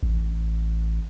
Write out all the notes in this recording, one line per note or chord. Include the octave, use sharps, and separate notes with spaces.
A1